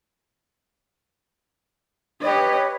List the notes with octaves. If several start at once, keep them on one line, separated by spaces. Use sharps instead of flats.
G4 B4 C#5 D#5